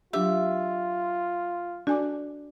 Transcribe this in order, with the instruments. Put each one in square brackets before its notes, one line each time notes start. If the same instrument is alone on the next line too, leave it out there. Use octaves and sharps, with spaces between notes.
[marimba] F#3 D4 G4 [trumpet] F4 [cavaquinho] E5
[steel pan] D4 [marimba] F#4 G#5 D6